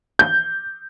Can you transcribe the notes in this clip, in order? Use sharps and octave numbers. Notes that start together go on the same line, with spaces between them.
G6